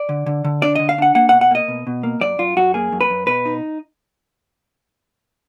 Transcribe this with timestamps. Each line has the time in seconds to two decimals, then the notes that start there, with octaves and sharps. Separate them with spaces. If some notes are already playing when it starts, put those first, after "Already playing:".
Already playing: D5
0.09 D3
0.26 D3
0.45 D3
0.62 D4 D5
0.75 D3 D#5
0.89 F5
0.98 D4 F#5
1.15 A#3 F#5
1.29 F#5
1.32 B2
1.41 F#5
1.51 A#3 D#5
1.68 B2
1.87 B2
2.03 A#3
2.21 F#2 D5
2.39 F#2 F4
2.57 F#2 F#4
2.74 A#3 G#4
2.92 F#2
3.01 B4
3.10 F#2
3.27 B2 B4
3.45 D#4